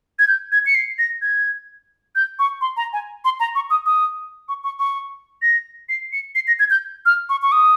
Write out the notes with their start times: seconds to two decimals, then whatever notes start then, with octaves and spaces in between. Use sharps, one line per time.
0.19 G#6
0.28 G6
0.52 G#6
0.66 C#7
0.75 C7
0.99 A#6
1.22 G#6
2.16 G6
2.39 C#6
2.61 C6
2.77 A#5
2.93 G#5
3.25 C6
3.40 A#5
3.55 C#6
3.70 D#6
3.86 D#6
4.49 C#6
4.64 C#6
4.79 C#6
5.42 A#6
5.89 C7
6.12 C#7
6.35 C7
6.48 A#6
6.59 G#6
6.70 G6
7.06 F6
7.29 C#6
7.42 C#6
7.52 D#6